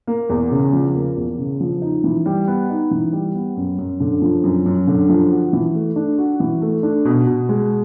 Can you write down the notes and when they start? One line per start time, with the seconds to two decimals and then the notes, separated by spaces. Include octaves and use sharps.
0.07 A#3
0.30 E2
0.51 C#3
0.73 F3
0.95 A#3
1.17 E2
1.38 C#3
1.60 F3
1.82 D#4
2.04 E3
2.26 G3
2.48 B3
2.70 D#4
2.91 E3
3.13 G3
3.35 B3
3.56 F#2
3.78 F#2
4.00 D3
4.22 F3
4.44 F#2
4.66 F#2
4.87 D3
5.09 F3
5.31 F#4
5.53 E3
5.75 A3
5.96 D4
6.18 F#4
6.40 E3
6.62 A3
6.83 D4
7.05 B2
7.27 B2
7.49 G#3